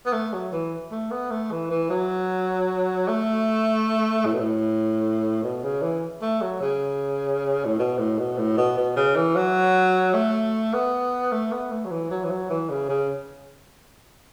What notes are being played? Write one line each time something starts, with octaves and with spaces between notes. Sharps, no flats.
B3
A3
F#3
E3
A3
B3
A3
E3
E3
F#3
A3
A2
B2
A2
B2
C#3
E3
A3
F#3
C#3
A2
B2
A2
B2
A2
B2
B2
C#3
E3
F#3
A3
B3
A3
B3
A3
F#3
E3
F#3
E3
F#3
E3
C#3
C#3